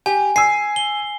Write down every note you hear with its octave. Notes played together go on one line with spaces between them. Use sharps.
G4 G#5
G#5 E6 C7
G7